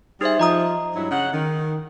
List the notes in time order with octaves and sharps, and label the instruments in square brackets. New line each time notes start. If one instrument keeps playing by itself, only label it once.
[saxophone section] G3 G#4 C5 [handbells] D#4 E5
[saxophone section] F3 [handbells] D#5 A#5 D#6
[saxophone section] G2 F#3 E4
C#3 F#5
D#3